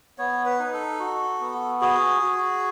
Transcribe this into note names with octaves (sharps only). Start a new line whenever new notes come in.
B3 C#5
B4
D#4
A4
F#4
B3
F#4 G#4
F#4